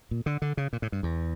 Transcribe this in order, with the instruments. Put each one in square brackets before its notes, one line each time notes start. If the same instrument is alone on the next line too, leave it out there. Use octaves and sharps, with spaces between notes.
[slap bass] A#2
D3
D3
C#3
A#2
A2
G2
E2